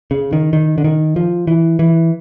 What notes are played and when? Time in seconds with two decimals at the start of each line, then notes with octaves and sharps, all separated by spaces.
0.11 C#3
0.33 D#3
0.53 D#3
0.78 D3
0.84 D#3
1.16 F3
1.47 E3
1.79 E3